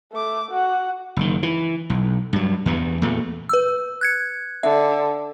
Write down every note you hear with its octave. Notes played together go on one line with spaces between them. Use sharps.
A3 D6
F#4 F#5
F#1 D#3
E3
B1
G2 F#3
E2 G2 B3
E2 A#2 A3 B3
B4 E6
F#6 G#6 C#7
D3 E5